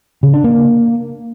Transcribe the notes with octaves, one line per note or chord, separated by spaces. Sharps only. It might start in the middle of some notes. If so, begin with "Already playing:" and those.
C#3
D4
A#3